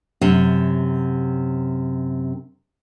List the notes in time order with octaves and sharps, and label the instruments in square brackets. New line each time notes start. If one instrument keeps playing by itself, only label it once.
[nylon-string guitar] F#2 C3